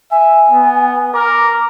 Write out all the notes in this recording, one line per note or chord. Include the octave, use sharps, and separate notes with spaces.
E5 G#5
B3
A#4 D6